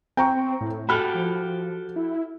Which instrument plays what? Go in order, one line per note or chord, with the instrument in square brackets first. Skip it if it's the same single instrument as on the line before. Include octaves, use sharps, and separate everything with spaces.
[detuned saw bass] C4 [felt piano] G5 A#5 C#6
[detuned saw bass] A2
[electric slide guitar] F#4 G4 A4 [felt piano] B5 F6
[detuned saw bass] F3
E4